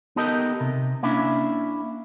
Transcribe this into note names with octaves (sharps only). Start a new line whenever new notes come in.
B3 D#4 G4 A4 A#4 D#5
C3
A#3 C#4 D4 E4 E5